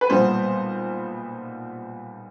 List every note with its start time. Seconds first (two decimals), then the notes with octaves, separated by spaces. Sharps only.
0.01 B4
0.10 B1 A#2 G3 B3 C5